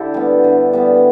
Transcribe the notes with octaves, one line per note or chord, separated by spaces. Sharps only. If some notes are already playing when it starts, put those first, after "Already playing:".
Already playing: D3 E4 G4 A4
G3 B3
D3
G3 B3